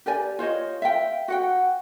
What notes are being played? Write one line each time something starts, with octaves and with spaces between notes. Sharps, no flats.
G4 A#4 D5 G#5
F4 C5 C#5 D#5
E5 F5 G5
F#4 F#5 G5